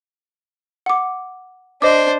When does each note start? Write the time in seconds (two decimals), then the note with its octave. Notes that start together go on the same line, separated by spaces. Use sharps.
0.86 F#5 D6
1.82 D4 C5 D#5 D6